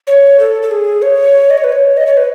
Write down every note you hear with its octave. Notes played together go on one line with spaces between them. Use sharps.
C#5
A4
A4
G#4
C#5
D#5
C#5
B4
C#5
D#5
C#5
B4